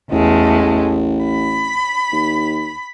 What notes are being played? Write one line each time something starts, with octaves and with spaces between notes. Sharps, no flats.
A1 E2 G#3 A3
B5
D#2